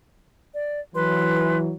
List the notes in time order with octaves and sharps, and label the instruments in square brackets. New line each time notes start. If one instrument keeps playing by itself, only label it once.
[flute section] D5
[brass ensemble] E3 F#3 [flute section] B4 C6